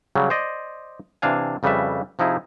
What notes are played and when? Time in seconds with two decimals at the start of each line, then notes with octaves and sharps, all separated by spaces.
0.15 C#3 F#3 G3
0.30 C5 D5 D#5
1.22 C3 E3 D4 F5 G#5
1.63 F2 C#3 G3 A4 B4 E5
2.19 C3 F3 D#4 E4 G#4